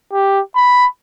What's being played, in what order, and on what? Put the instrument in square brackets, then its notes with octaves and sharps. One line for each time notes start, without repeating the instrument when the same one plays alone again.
[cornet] G4
B5